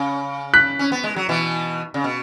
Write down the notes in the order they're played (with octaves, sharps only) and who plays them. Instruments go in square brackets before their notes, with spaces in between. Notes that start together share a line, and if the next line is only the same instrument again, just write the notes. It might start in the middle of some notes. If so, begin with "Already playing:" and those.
Already playing: [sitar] C#3
[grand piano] F#6 B6
[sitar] C#4
B3
G#3
F#3
B2 E3
C#3
B2